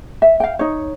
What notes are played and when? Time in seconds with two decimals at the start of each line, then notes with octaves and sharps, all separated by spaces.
0.22 E5
0.40 F5 G5
0.59 D#4 C#5